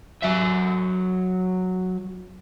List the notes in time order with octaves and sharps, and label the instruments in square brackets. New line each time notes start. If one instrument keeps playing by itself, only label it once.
[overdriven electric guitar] F#3 E5